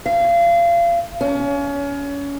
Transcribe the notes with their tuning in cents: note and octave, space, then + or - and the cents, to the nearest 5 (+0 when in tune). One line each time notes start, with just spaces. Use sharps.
F5 -30
C#4 +25